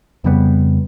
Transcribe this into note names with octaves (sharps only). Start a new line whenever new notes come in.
F2 C#3 G3 B3